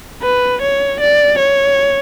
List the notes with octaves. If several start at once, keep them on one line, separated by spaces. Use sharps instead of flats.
B4
C#5
D5
C#5